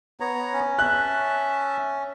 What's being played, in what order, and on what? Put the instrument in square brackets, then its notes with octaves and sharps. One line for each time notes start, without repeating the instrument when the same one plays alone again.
[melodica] B3 C#5 A#5
[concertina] C#4
[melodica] E5 A5 [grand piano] F#6